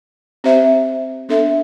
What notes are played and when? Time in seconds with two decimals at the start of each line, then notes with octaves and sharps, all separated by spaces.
0.44 C4 G4 C5 E5
1.29 B3 D4 A4 E5